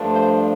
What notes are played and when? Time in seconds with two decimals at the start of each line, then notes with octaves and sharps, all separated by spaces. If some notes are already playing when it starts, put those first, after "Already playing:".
Already playing: G2 F3 A3 D4
0.11 C5